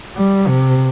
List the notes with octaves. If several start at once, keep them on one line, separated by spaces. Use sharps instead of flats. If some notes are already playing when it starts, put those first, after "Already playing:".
G3
C3